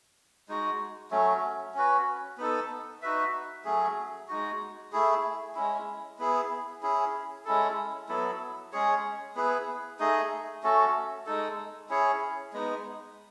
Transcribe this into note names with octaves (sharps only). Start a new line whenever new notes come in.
G#3 D#4 F#4
F#3 A3 C#4
C#4 F#4 B4
B3 D#4 A4
D#4 F#4 B4 E5
F#3 A3 C#4 G#4
G#3 D#4 F#4
A3 E4 G#4
G#3 C#4 E4
B3 E4 G#4
C#4 E4 G#4
G#3 C#4 E4 A4
F#3 B3 E4 A4
G#3 C#4 G#4 C#5
B3 E4 G#4 B4
A3 D#4 G#4 D#5
A3 C#4 F#4 A4
G#3 D#4 A4
C#4 E4 G#4 C#5
G#3 B3 D#4